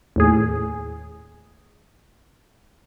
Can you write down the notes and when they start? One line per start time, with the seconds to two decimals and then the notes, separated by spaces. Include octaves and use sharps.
0.16 D#2 A2 G#4